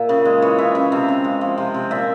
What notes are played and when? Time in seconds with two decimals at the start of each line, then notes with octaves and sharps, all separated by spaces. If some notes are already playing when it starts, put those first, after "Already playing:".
Already playing: A#2 A#4 E5
0.09 C#3
0.25 G#3
0.42 E3 C#5
0.58 C#3 E5
0.75 C#3 E5
0.92 C3 F5
1.08 C3
1.24 G#3
1.41 F3
1.58 C3
1.74 C3
1.91 A#2 E5